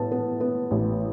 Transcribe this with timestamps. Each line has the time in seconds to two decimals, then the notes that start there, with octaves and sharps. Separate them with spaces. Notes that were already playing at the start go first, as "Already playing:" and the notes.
Already playing: A2 B3 A5
0.12 B3
0.40 B3
0.71 A1